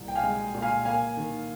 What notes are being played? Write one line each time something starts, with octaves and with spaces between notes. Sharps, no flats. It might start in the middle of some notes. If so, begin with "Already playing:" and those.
Already playing: C2 A#2 F3
G5
F5 G#5
G#3
A#2
F5 G#5
A#3 F5 G#5
D#3